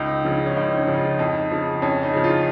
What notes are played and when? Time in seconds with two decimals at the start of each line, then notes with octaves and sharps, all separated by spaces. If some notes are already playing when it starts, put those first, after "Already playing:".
Already playing: C#2 D#4
0.25 C#3 F3
0.46 C#4
0.56 C#2 D#4
0.77 C#4
0.87 C#3 F3
0.93 D#4
0.98 F4
1.19 F2 D#4
1.51 C#3 F3
1.82 F2 C#4
2.03 D#4
2.13 C#3 F3
2.24 F4